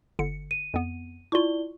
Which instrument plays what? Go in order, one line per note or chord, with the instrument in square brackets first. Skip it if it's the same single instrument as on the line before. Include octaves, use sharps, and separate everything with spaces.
[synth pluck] G1 D3 C#7
[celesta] D#7
[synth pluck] F2 B3
[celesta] E4 D5 G7 [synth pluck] F4 C#6